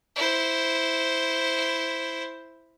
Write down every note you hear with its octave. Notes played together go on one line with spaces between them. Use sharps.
E4 C5